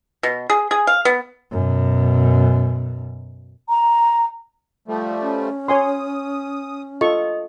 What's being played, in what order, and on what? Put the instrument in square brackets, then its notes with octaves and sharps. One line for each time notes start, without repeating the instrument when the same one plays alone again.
[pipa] B2
G#4
G#4
F5
B3
[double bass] F#2 B2
[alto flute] A#5
[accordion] F3 G3 A3
[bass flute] C#4
[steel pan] C#5 G#5 C6 [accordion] D#6
[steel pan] F4 A4 C#6 [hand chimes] D#5